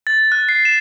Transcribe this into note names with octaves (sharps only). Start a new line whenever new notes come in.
A6
F#6
C7
E7